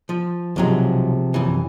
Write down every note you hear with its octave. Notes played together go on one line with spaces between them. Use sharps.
F3
B1 C3 F3 F#3 G#3
F#2 E3